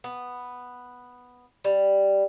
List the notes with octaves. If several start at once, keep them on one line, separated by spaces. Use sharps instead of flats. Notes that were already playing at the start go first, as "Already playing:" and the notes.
B3
G3